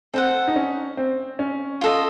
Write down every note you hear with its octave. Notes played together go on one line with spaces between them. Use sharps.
C4 A4 C5 F#5
D#4
C#4
C4
C#4
F4 A4 D#5